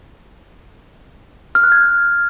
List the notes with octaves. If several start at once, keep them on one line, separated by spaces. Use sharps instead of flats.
F6
F#6
G#6